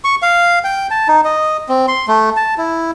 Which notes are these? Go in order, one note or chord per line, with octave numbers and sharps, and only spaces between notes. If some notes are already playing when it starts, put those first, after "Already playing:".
C#6
F5
G5
A5
D#4
D#5
C4
C6
A3
A5
E4